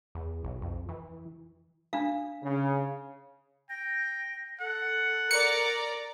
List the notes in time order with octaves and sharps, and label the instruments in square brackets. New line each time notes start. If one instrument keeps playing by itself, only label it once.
[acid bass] E2
B1
F2
E3
[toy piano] D4 F5
[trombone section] C#3
[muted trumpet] G5 [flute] A#6
[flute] A4 [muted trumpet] F#5
[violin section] A#4 D5 A#5 [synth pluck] C#7